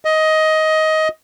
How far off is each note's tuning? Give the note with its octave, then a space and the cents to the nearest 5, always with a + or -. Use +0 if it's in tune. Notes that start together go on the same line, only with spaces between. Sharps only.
D#5 +15